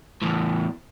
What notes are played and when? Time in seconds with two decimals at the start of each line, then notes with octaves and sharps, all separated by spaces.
0.22 E2 A2